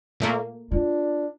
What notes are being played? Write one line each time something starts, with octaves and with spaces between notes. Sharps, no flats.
A#2 A3 A#3
D4 F4